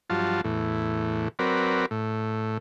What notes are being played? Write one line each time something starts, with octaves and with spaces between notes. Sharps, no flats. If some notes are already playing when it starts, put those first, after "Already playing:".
G2 F3 F#3 F4 A5
E2 A2
F#3 C4 A#4 B4 D5
A2